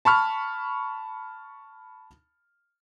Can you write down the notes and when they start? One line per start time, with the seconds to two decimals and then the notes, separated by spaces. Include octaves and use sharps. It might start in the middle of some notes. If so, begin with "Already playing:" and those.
0.05 A5 B5 C#6 F6